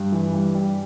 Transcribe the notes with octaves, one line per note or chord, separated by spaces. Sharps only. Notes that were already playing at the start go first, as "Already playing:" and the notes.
Already playing: G2
E3
G2
G3